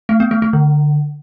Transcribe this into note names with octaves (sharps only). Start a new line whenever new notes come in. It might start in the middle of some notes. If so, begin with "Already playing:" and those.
A3
B3
A3
A3
D3